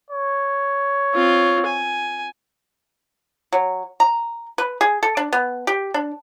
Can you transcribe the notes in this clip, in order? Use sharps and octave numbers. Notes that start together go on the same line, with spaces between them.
C#5
C4 F4
G#5
F#3
A#5
B4
G#4
A4
D4
B3
G4
D4